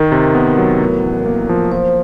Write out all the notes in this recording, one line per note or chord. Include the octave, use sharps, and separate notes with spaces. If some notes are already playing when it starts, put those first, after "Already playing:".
Already playing: D#3 A#4
C3
B3
F#3
A2
A1
A#3
F3
F3 C5